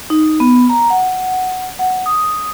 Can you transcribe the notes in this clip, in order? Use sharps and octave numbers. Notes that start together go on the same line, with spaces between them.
D#4
B3
A#5
F#5
F#5
D#6